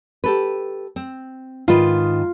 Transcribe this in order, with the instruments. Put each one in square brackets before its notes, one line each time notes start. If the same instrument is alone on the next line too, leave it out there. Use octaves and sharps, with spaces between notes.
[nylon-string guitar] G4 A4 B4
C4
[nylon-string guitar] G#2 D#3 B4 [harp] F4